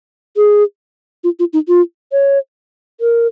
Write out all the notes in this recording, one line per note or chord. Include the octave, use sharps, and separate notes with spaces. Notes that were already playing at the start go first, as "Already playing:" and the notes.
G#4
F4
F4
D#4
F4
C#5
A#4